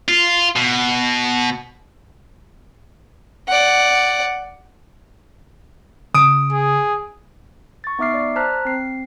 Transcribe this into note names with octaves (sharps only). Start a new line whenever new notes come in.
F4
B2
D5 F#5
C#3 D#6 D7
G#4
C#6 A6
B3 D#4 E5 D6 F6 C7
D5
C5 A5 A#5 F6 F#6 B6
C4 C7